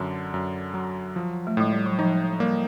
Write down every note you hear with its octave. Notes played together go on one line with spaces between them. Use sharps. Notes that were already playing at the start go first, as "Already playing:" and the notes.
Already playing: F#2 D3
F#2
F#3
F3
A3
A2 G#3
G3
F#3
F3 D#4
G3 A#3